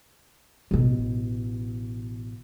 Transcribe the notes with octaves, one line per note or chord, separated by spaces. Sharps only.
A1 B2